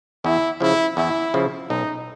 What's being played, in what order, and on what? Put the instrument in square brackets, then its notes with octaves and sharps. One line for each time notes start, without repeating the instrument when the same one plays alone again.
[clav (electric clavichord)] E2 [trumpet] E4
[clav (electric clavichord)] C#3 F3 [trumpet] E4
[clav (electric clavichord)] E2 [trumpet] E4
[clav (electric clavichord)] C#3 F3
[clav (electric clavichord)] B1 [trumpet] D#4